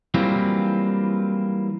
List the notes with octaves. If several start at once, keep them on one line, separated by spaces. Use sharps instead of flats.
E3 F#3 G3 A#3 C4 F4